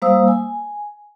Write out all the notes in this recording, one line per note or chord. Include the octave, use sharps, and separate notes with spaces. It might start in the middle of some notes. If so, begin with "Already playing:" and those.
G3 A#3 C5 F5 D#6 E6
G#5